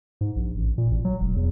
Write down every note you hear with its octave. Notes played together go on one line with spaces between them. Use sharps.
G#2
A#1
A1
A#2
A1
F#3
E1
E2